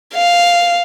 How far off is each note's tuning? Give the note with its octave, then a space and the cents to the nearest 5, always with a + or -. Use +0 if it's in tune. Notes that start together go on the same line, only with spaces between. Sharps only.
F5 +0